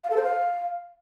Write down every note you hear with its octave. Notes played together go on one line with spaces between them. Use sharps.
F5
A4
C5
F5